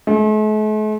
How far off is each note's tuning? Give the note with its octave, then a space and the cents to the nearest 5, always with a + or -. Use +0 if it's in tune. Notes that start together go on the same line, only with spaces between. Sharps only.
A3 -45